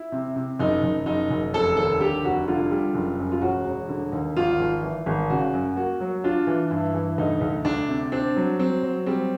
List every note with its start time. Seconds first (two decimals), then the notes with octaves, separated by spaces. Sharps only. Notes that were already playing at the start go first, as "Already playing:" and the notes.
Already playing: E4
0.12 C3
0.36 C3
0.59 F#1 D#4
0.83 F#1
1.06 F#1 D#4
1.31 F#1
1.54 F1 A4
1.77 D#2 A4
2.00 D3 G4
2.24 F1 F#4
2.48 D3 F4
2.71 G3
2.95 F#1
3.19 F#2
3.32 F4
3.41 E1 F#4
3.65 E1
3.89 D3
4.12 D#2
4.36 G#1 F4
4.60 G#1
4.83 E3
5.06 G#1
5.30 C#3 F#4
5.54 F#2
5.76 A#3 F#4
6.00 F#3
6.24 D4 F4
6.47 E3
6.71 G2 E4
6.94 E3
7.18 D2 D#4
7.41 D2
7.65 D2 D4
7.88 C3
8.12 C4 D4
8.36 F#3
8.59 F#3 C4
8.83 F#3
9.06 G3 C4